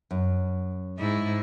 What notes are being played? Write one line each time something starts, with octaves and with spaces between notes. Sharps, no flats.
F#2
G#2 E4